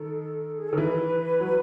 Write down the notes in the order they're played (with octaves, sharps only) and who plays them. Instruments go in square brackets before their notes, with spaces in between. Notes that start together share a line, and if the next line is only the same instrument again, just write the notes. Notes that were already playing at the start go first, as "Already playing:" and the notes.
Already playing: [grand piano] D#3 [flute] A4
[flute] G#4
[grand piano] D#3 [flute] A4
[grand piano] E3 [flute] B4
[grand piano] F#3